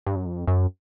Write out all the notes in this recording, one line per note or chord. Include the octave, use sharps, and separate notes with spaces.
G2
F#2
F2
F#2